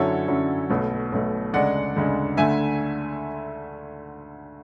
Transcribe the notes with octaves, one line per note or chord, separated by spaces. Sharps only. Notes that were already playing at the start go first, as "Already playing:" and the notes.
Already playing: F#2 D3 F#3 C#4 E4 A4 C#5
F#2 D3 F#3 C#4 E4
B1 B2 A3
B1 B2 A3
D2 C#3 G#3 D4 D5 F#5
D2 C#3 G#3 D4
D2 D3 A3 E5 G#5